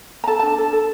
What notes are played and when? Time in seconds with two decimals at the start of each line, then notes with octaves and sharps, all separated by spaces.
0.24 A#5
0.27 A4 A5
0.39 D4 A5
0.58 A4
0.73 A4